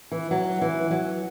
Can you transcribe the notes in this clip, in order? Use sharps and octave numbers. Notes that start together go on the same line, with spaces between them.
E3
F#3
E3
F#3